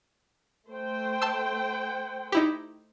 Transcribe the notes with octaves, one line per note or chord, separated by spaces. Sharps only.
A3 C5 G5
A5 C6 E6
D#4 E4 G4